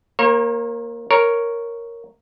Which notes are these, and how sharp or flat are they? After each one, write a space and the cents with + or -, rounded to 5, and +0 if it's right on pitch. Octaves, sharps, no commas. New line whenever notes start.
A#3 +0 C#5 -45 A#5 +30
A#4 +0 C#5 +0